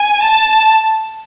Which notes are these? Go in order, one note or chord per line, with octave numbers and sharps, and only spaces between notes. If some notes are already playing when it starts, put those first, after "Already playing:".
Already playing: G#5
A5